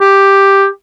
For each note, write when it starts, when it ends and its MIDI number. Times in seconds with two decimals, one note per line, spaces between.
0.01 0.66 67